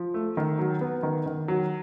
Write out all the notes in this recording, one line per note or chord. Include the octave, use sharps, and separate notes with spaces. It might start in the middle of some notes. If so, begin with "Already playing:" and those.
Already playing: F3
A3
D#3
F#3
B3
D#3
D#3
F#3